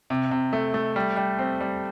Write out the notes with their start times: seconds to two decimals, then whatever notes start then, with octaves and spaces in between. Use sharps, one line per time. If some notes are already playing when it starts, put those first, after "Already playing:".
0.10 C3
0.31 C3
0.53 A3
0.74 A3
0.96 G3
1.17 G3
1.39 C4
1.60 G3